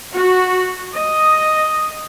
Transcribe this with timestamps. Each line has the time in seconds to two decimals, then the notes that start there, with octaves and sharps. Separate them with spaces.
0.13 F#4
0.95 D#5